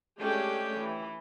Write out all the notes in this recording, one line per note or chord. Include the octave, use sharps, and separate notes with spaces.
G#3 A3 C#4 D4 G4 G5
E3